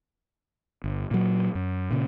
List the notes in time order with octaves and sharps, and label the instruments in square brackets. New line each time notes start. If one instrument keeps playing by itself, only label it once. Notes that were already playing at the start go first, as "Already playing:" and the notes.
[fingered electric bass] G1
A#2 F#3
F#2
A#2 C#3